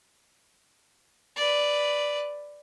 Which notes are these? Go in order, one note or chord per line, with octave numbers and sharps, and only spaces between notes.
B4 D5